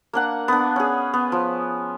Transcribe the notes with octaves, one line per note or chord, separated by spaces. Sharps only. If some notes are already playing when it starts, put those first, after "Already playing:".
A#3 D4 F#5
B3 D4
C#4 G#4
B3
F3